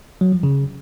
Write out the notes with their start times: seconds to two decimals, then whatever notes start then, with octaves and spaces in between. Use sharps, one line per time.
0.21 F#3
0.32 F3
0.43 C#3